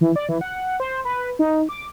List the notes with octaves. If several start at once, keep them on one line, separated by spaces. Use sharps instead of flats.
E3
D5
E3
F#5
C5
B4
D#4
D6